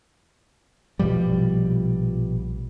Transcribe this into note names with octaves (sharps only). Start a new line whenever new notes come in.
A#1 B2 F3 G3